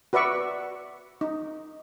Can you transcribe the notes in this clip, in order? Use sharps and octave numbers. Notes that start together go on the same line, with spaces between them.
F#4 B4 D5 E5 C#6
D#4